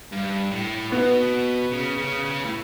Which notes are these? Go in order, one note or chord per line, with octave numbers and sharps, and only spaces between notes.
G2
A2
B2 B3
C#3
C#3
C#3
A2